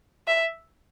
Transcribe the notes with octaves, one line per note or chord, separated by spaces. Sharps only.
E5